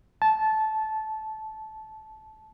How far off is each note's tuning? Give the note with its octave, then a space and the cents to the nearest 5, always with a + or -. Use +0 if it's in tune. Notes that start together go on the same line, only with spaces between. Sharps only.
A5 -15